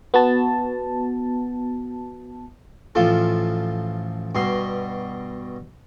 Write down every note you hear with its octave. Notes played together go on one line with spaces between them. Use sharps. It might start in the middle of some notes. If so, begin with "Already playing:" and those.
B3 F#4 A5
A1 F3 F4 A4
G2 B2 C6